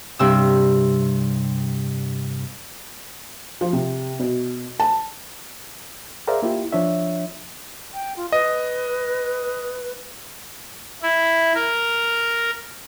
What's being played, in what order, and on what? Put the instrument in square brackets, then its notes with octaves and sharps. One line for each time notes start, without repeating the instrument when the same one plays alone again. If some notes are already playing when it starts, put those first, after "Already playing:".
[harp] G2 C3 E6
[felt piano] F3
C3
B2
A5
[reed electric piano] G#4 A#4 C5 D5 E5 F5
A#3 E4 F4 G4
F3 D4 C#5 E5
[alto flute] G5
F4
[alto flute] B4 [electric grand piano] D#5
[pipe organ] E4
A#4